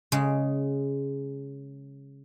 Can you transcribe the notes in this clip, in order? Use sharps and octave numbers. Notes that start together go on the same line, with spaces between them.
C#3 G#3